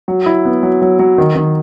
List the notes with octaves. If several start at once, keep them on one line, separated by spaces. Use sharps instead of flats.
F#3
E4
B3
F#3
F#3
F#3
D#3
D#3